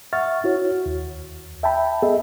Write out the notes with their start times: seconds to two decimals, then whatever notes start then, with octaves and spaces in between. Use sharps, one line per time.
0.13 E5 F#5 C#6 F6 A6
0.44 E4 F#4 C#5
0.86 D#2
1.63 E5 G5 A5 B5
2.02 B3 G#4 A4 D#5 E5